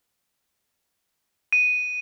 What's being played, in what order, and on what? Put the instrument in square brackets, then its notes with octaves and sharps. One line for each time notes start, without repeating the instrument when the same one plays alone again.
[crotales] D#7